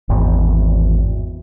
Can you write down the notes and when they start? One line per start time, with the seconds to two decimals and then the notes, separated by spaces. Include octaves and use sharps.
0.09 G#1 E2